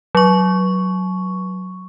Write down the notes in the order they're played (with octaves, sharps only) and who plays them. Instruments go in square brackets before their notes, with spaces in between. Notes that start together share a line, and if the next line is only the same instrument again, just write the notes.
[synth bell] F#3 C#6